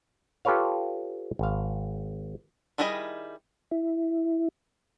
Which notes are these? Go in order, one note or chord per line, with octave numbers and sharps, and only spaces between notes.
F4 G4 A4 B4 C#5 F5
G#1 F5
D#3 G3 E4 G#4 D#5
E4